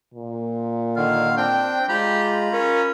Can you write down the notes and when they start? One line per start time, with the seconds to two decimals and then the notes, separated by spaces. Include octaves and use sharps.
0.14 A#2
0.96 D3 D#3 F5
1.37 C4 D4 G5
1.89 G#3 F4 G4 A#5 B5
2.53 C#4 A#4